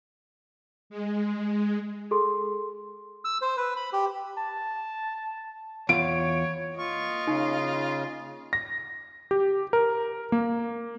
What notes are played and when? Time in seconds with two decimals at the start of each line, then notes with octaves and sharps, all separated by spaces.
0.90 G#3
2.11 G#4 A4 C6
3.25 E6
3.42 C5
3.57 B4
3.77 B5
3.93 G4
4.38 A5
5.89 E2 F4 C#5 D7
6.78 A#3 F4 D#5 C#6
7.27 C#3 D#4
8.53 A#6
9.31 G4
9.73 A#4
10.32 A#3